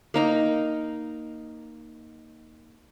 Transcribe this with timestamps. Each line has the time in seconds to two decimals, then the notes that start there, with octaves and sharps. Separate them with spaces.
0.14 A#3 D#4 A#5